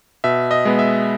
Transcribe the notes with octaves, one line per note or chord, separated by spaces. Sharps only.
B2 E5
D#5
G#3 B3
E5